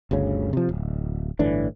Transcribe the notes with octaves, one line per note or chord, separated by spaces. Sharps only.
G1 D2 C#3 C#4
C3 F3
D1
G1 A2 E3 D4